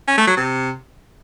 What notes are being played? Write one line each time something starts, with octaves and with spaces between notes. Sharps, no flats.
C#4
A3
F#3
C3